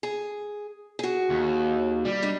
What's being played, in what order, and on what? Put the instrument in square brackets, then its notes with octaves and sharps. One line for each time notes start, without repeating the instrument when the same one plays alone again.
[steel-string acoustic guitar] G#4
F#4 G#4
[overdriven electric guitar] D#2
G3
[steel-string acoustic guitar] D4 D#4